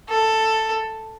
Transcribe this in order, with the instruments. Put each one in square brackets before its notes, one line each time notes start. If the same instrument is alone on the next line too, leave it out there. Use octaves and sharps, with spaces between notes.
[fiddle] A4